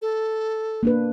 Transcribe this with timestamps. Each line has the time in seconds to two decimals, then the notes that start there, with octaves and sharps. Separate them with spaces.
0.02 A4
0.83 A#3 D4 B4